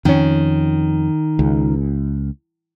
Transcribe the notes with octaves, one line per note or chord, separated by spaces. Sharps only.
F2 D#3 C#4
C#2